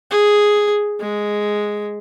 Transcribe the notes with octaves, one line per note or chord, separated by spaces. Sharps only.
G#4
G#3